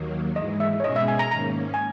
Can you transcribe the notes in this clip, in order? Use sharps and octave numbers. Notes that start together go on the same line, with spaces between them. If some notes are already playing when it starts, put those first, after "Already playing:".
Already playing: D#2 D#3 F#3 A#3
G#2 E3 G#3 D#5
E5
C#5
B2 G#3 C#4 G#4 D#5
E5
G#5
A#5
G#2 D#3 A#3 C#4 A#5
G#5